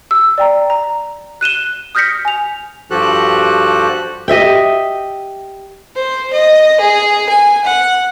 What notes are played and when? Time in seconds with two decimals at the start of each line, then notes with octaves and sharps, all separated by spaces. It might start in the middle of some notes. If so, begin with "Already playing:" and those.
0.11 E6
0.38 D5 G5 A#5
0.70 A#5
1.41 F#6 D#7 E7 G7
1.95 D#6 F6 G6 A#6 B6 C#7
2.25 G#5 F7
2.91 G2 F3 F#4 G4 A4 F#6
4.28 G4 D#5 E5 G5
5.96 C5
6.33 D#5
6.80 G#4
7.29 G#5
7.65 F#5